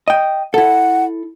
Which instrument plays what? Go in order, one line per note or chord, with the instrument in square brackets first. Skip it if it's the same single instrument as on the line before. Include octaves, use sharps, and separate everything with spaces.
[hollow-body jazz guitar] D#5 G5
[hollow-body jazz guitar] E4 A4 [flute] F#5